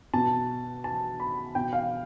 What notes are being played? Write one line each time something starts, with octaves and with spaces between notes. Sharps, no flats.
B2 A5
A5
B5
B2 G5
F5